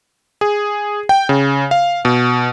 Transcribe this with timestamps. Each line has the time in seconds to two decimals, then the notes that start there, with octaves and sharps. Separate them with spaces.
0.41 G#4
1.09 G5
1.29 C#3
1.71 F5
2.05 B2